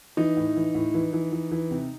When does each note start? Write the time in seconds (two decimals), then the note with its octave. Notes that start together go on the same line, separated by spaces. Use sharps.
0.17 E3 D#4
0.37 A2
0.56 E3
0.75 A2
0.94 E3
1.13 E3
1.32 E3
1.51 E3
1.71 C3